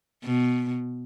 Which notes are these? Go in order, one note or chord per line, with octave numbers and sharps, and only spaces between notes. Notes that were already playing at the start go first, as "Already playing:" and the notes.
B2